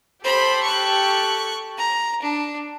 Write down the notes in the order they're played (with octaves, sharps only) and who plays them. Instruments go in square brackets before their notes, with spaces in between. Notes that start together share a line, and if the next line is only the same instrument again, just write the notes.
[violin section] G4 A4 [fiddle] C5 B5
[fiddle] C#6 F#6
A#5
D4